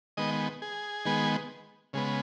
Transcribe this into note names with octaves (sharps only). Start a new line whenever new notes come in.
D#3 G#3 B3 D#5
G#4
D#3 G#3 B3
C#3 G#3 B3